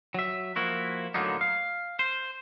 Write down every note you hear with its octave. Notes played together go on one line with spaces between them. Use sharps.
F#3 E5
F3 A#3 E4 F#4
A2 D3 F#3 A#3 B3 D#4
F5
C5